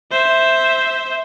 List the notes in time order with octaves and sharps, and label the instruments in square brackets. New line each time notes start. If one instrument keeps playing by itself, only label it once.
[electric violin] C5 E5